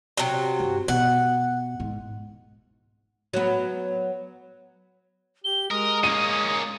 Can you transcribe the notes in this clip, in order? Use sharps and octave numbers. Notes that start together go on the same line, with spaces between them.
C3 F#3
G2
B2 F#5
G#2
F#3 B3
G4 G7
G#3 A#4 D#6
A#3 C#4 D#7